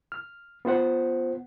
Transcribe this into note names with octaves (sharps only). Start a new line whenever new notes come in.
F6
B3 F4 C5 F#5